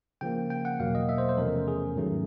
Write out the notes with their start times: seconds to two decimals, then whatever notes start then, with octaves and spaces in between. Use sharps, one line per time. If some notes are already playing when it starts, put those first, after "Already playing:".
0.21 C#3 F3 A#3 G5
0.50 G5
0.65 F#5
0.79 E2 B2 F#3 A#3 F5
0.95 D#5
1.09 E5
1.18 C5
1.29 C5
1.37 E2 C3 F3 A3 C#4 A#4
1.68 G#4
1.96 G#2 D#3 F#3 A3 C#4